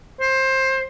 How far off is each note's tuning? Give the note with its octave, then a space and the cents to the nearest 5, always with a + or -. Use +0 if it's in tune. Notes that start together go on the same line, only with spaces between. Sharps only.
C5 +20